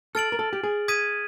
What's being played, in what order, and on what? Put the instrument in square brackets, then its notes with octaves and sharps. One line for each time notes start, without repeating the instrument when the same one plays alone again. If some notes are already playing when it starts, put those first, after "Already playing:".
[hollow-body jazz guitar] A4 [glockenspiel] F6 A6 D7 F#7
[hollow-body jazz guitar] A#4
A4
G4
G#4
[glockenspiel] D#6 G#6 B6 D#7